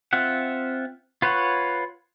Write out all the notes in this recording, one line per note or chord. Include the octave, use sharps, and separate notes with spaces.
C4 F4 E5 F#5
F4 B4 C#5 F#5